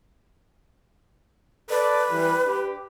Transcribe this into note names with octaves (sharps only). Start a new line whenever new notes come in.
A4 B4 D5
E3 G3
D4 G4